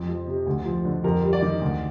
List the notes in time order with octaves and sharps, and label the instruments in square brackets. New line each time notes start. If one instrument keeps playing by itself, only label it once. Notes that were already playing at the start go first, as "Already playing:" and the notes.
Already playing: [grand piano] F2
F3
C3
D2
F3
D3
F2 A#4
G3
D5
D#3
D2